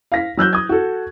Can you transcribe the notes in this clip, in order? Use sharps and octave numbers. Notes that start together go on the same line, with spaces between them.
F5 A#6 B6
F#3 E6 F#6 G6
D#6 G#6
F#4 A4